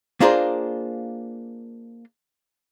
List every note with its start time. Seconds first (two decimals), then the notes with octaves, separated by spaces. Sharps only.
0.20 A#3 D4 F4 G#4 A#4 C5